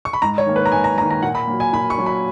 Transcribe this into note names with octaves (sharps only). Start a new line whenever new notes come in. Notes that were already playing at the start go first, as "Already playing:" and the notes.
C#6
B5
G#2 A#5
C#5
D#3 A#3
B4
A#5
G#2 G#5
A#5
D#3 A#3 A#5
A#5
A#2 F#5
B5
F#3 A#3
G#5
A#2 B5
C#6
F#3 A#3
B5